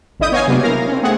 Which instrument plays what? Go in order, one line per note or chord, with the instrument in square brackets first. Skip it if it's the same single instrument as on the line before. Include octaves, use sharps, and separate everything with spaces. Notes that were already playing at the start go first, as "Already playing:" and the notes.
[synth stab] G#1 D3 E4 D#5 D#6 G6
B3 C#5 D#5 F5 G#5
C3 F#3 G#3 A#3 B3 D4
E4 A#4 F5 A#6
C4 C#4
A3 B3 C4 G#4 F#5